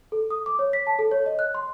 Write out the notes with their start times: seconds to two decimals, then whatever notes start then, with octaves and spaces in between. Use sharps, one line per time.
0.12 A4
0.30 D#6
0.46 D6
0.59 C#5
0.73 B6
0.87 A5
0.99 A4
1.11 C#5
1.26 D#5
1.39 F#6
1.55 C6